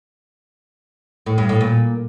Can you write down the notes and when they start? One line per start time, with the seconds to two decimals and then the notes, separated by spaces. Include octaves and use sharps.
1.26 A2
1.38 G2
1.49 A2
1.61 A#2